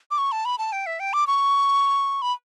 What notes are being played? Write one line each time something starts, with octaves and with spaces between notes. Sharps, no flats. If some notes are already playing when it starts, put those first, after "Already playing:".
D6
C#6
A5
B5
A5
G5
E5
G5
D6
C#6
B5